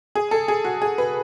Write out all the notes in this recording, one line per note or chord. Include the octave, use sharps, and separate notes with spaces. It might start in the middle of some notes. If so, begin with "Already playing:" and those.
G#4
A4
G#4
F#4
G#4
B4